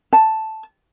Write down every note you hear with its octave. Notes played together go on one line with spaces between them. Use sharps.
A5